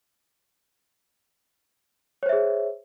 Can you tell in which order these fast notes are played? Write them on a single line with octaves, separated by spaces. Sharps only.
C#5 C5 E5 G#4